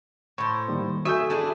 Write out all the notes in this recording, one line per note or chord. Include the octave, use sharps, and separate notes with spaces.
A2 C5 C#6
D#3 G3 A#3
F#4 A4 E5 G#5 C#6
D4 E4 G#4